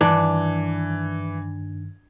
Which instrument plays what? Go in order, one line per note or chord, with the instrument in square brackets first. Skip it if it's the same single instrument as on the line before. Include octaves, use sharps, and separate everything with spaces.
[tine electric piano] G2 D#3 [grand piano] E3 [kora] D4